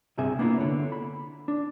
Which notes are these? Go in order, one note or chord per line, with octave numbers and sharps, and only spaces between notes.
C2 G2 C3 G#4 E5
A#3 B3 D4 E4 F4
D3 C#5
B5
D4